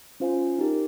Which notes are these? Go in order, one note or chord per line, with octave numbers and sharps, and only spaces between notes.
C#4 F4 C5 F5 G#5
D#4 G4 A#4